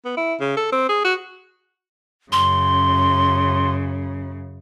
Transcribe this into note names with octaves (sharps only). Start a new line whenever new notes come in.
B3
E4
C#3
A4
C4
G#4
F#4
F#2 C#3 C6